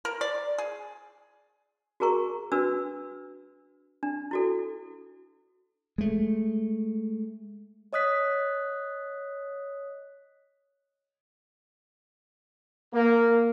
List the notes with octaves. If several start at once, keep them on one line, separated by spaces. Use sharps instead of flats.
A#4
D5
G#4
F#4 G#4 A#4 A#5 C#6
D4 F#4 B4 E6
D4
E4 F#4 A4
G#3 A3
C#5 D#5 D#6 F#6 B6
A#3